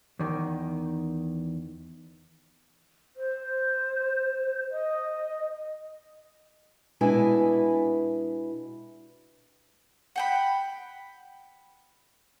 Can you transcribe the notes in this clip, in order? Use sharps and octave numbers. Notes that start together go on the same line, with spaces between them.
E2 D#3
C5
D#5
B2 G#3 D4 E4 B4 G#5
F#5 G5 B5